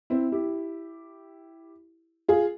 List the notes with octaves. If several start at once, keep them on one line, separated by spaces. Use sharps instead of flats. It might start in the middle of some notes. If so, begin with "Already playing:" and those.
C4 E4
E4 G4
F4 G#4